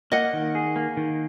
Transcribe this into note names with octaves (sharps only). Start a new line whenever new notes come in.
A#3 D#5 F#5
D#3
G#4
A#3
D#3